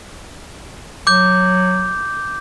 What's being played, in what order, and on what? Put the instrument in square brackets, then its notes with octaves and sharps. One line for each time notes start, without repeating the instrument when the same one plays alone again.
[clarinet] F#3 [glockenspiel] D6 G6